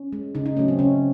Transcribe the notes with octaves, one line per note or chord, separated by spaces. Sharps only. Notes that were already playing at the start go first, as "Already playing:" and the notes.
Already playing: C#4
G#3
C#3 D#4
D#4
F#3 A3 C#4
C4
C#3 C#4